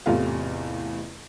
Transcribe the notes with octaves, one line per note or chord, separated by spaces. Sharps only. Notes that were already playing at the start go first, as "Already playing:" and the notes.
A1 E2 C3 F4 A4 F5